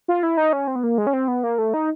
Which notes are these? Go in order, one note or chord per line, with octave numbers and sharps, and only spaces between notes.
F4
E4
D#4
C#4
C4
B3
A#3
G#3
C#4
C4
B3
A#3
A3
D#4